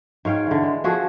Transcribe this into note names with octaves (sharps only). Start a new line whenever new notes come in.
G#2 C#5 F5 G5
D3 E3
G#3
F3 F#4 G#4 A4